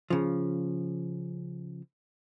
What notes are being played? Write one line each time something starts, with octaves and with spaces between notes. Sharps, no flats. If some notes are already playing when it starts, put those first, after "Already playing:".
C#3 F3